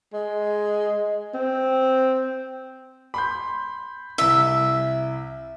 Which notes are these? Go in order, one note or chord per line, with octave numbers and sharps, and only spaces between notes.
G#3
C4
B5 C6 G6
C2 E4 E5